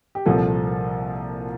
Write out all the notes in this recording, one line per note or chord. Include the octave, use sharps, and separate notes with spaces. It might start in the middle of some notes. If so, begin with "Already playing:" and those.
G4
C2 A#2 F3 A4